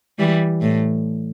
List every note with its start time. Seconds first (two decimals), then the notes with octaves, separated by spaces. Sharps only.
0.19 E3 G3
0.62 A2